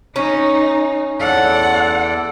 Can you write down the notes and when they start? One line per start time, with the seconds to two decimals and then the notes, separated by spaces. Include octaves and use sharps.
0.16 C#4 D#4
1.20 E2 A4 D5 F#5